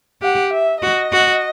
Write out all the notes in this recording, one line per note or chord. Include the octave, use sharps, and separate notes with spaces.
G4 F#5
E5
F#4 D#5
F#4